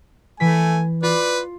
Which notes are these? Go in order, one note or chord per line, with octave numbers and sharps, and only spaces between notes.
E3 A3 G#5 B6
F4 B4 D5